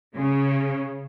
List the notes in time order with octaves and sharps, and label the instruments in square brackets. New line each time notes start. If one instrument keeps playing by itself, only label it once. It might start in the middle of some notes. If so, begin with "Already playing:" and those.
[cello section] C#3